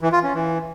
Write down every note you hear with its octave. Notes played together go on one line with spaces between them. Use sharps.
E3
F4
C#4
E3